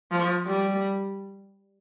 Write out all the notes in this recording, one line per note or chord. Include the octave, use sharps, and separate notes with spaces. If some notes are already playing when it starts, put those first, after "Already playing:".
F3
G3